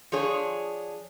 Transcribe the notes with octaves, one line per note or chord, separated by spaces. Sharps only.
F3 D4 G#4 C#5